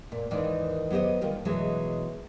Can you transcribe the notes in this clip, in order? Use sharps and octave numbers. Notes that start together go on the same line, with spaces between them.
A#2
D#2 G#2 D#3 E3 A#3 D5
F#3 B3 G4 C5 D#5
D3 D#3 G3 A#3 F4 G4
B2 E3 F#3 G#3